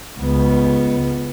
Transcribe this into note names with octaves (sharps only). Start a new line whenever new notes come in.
C#2 B3